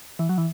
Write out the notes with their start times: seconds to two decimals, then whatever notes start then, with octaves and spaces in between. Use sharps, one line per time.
0.19 E3
0.29 F#3
0.38 E3